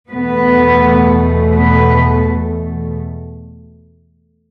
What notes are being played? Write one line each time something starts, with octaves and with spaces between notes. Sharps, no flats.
E2 B2 A3 B3 B4
B3 B4